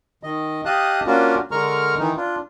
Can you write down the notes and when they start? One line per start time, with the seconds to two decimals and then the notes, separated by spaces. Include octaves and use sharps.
0.23 D#3 D#5
0.65 G4 D#5 F5 A5 D#6 F#6
1.06 A#3 C#4 D4 F4 F#4 A#4
1.51 D3 G#3 A#4 A#5 C#6 F6
1.99 D#3 E3 D#4
2.17 D4 F4